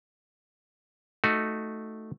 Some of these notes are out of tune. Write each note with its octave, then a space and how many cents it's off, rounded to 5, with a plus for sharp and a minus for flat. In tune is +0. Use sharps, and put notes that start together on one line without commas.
A3 +0 D#4 +0 F#4 +0